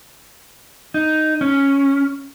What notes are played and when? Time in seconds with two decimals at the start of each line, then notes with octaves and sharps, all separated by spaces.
0.94 D#4
1.41 C#4